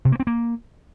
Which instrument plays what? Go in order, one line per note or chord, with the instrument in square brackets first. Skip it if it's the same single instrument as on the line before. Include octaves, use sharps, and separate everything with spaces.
[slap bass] C3
A#3
C4
A#3